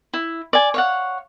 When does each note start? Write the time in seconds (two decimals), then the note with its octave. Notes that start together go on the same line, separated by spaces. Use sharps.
0.14 E4
0.53 D5 G#5
0.74 C#5 F5 F#5